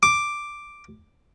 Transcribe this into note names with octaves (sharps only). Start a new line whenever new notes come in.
D6